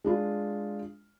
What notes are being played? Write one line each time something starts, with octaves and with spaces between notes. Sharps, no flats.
G#3 D4 F4